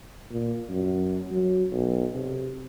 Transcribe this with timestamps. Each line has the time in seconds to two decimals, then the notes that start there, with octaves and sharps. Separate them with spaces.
0.30 A#2
0.69 F#2
1.31 F#3
1.72 B1
2.14 C3